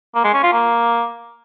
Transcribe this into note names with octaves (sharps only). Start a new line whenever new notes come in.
A#3
G#3
C#4
F4
A#3